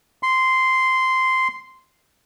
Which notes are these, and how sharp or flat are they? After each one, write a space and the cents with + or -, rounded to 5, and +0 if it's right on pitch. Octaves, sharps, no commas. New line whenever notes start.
C6 -10